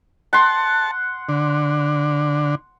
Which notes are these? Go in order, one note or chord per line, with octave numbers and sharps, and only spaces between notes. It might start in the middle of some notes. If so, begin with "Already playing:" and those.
F#5 A5 C6
D3